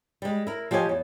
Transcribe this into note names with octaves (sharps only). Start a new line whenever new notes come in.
G3 G#3
E4 A#4
F3 G4 C#5 D#5 G#5
E2